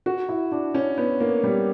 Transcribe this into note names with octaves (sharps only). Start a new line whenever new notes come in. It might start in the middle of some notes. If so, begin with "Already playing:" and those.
F#4
E4
D4
C#4
B3
A#3
G3